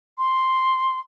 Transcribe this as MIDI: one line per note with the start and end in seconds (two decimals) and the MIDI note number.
0.18 0.99 84